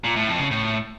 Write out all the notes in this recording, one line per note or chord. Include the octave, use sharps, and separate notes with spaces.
A#2
A2
F2
C#3
A2